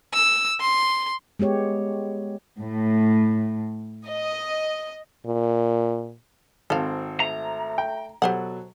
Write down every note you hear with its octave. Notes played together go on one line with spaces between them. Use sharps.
E6
C6
G#3 B3 G4 C#5
A2
D#5
A#2
G#1 C4 A4 F5
A3 A#5
G5
B2 F#3 G4 A4 C5 F#5